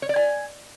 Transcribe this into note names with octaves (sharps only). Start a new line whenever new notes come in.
C#5
D5
G#5